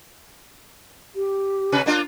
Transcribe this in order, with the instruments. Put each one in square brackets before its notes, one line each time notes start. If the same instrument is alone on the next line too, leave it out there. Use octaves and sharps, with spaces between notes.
[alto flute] G4
[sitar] C3 C#4 B4
A#3 D4 F4